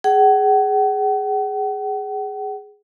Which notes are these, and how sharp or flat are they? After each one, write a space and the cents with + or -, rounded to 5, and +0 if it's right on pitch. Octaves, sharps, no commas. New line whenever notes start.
G#4 +0 F#5 +45